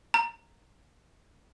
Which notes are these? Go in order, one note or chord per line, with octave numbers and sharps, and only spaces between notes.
A#5